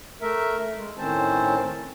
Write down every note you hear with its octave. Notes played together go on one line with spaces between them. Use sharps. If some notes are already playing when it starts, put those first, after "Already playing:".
A3 A#4 E5
G#3
A2 D#3 C4 C#4 C5 A5